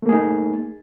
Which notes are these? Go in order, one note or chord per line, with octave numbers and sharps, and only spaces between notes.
A3 A#3 D#4 G#4